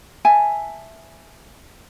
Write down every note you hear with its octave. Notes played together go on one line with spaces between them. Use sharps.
E5 G#5 A5